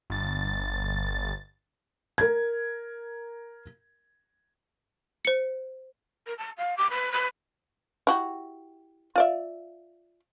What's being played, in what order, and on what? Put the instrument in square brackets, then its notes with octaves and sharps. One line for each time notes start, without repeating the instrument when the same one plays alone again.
[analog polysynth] G1 A6
[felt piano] A#4 G#6
[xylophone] C5 C#7
[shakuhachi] A#4
A5
F5
D6
B4
B4
[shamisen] E4 F#4 G4
F4 D5 E5